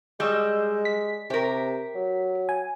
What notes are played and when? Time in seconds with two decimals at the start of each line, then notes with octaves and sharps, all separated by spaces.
0.20 G3 G#3 D#5 E6 G6
0.85 B6
1.30 C3 G4 A#4
1.95 F#3
2.49 G#5